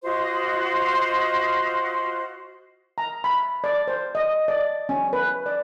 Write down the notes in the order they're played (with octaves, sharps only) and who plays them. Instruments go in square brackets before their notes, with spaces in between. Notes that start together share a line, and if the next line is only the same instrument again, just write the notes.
[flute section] F4 F#4 C5 D#5
[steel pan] A#5
B5
D5
C5
D#5
D5
C#4
B4
D5